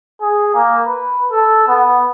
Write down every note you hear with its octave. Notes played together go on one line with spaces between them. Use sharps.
G#4
A#3
B4
A4
B3